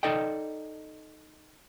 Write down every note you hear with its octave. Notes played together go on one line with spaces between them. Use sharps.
D#4 A4 D5 D#5 G5